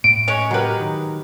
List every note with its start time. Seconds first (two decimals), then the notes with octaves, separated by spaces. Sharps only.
0.04 A2 D7
0.28 G#3 C#4 C#5
0.51 F#3 G#3 G4 A#4 B4
0.81 D#3